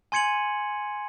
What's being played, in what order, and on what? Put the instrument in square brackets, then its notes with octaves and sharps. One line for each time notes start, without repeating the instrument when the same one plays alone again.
[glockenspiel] G#5 C6 G#6 C#7 D#7 F#7